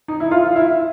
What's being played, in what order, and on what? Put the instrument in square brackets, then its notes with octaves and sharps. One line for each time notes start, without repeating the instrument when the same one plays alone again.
[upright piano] D#4
E4
F4
F4
E4